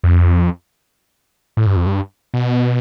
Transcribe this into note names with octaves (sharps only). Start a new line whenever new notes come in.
F2
A2
G2
F2
G2
B2